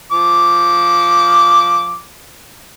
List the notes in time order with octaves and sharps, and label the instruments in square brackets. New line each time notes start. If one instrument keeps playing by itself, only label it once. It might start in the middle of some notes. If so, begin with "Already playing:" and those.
[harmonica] F3 D6